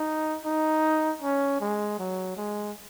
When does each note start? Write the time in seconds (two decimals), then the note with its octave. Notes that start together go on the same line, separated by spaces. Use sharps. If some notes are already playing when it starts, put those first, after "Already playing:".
Already playing: D#4
0.45 D#4
1.22 C#4
1.61 G#3
1.99 F#3
2.37 G#3